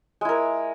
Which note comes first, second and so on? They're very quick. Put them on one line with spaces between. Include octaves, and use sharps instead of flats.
G#3 E4 A#4